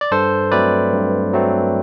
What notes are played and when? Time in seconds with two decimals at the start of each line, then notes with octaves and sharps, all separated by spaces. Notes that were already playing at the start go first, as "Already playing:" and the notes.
0.01 D5
0.12 G2 A4 C5
0.52 F#3 A3 C4 B4 D5
0.93 G2
1.33 F#3 A3 C4